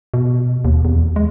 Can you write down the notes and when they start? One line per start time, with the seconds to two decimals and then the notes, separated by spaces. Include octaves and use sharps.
0.14 B2
0.65 D#2
0.85 E2
1.16 G#3